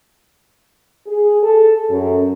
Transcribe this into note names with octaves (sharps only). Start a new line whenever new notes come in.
G#4
A4
F#2